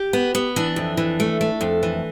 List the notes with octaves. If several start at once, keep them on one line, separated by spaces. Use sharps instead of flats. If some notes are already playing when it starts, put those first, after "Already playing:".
Already playing: G4
B3
B3
E3 D4
F2
E3
A3
A3
F2
E3